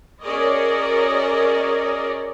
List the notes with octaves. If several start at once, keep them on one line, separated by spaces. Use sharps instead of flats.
C#4 F#4 G#4 A#4 D5 D#5